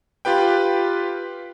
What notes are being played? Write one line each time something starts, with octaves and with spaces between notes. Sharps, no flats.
F4 G4 B4 G5